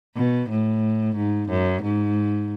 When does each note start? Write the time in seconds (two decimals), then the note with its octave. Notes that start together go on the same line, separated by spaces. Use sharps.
0.16 B2
0.50 A2
1.16 G#2
1.49 F#2
1.83 G#2